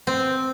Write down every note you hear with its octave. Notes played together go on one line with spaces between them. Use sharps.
C4